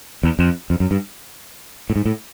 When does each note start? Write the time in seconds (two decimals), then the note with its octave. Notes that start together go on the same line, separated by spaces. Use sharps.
0.23 E2
0.39 F2
0.70 F2
0.80 F#2
0.91 G2
1.90 A2
1.96 G#2
2.06 A2